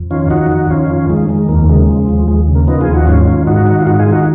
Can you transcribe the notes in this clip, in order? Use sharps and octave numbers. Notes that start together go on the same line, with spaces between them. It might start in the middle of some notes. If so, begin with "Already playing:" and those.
Already playing: F2
D#3 C#4 F4
F2 D#4 F#4
D#3
F2 C#4 F4
D#3
F2 G#3
D#3 G#3
D#2 A#3
C#3 G#3
F3
D#2
D#2 G#3
C#3
A#3
F3 B3 D#4
F4 G#4
D#2
D#4 F#4
G#2 C#4 F4
D#3
G#2 D#4 F#4
D#3 D#4
F4
G#2 D#4 F#4
F4 G#4
D#3
D#4 F#4